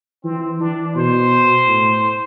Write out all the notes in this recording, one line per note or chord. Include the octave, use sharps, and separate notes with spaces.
E3 C4
E3 D4
B2 C5
A2